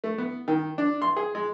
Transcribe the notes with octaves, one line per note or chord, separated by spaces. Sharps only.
A3
B3
D#3
D4
C6
G#4
G#3